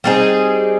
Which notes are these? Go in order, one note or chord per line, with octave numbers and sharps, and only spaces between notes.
G3 C4 D#4 G#4